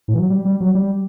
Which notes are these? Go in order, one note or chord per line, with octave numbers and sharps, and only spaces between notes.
A2
E3
F#3
G3
G3
F#3
G3